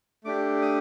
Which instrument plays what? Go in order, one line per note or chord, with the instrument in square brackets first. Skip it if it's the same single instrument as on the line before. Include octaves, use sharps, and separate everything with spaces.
[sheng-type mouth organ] A3 D4 G4 D6
D#6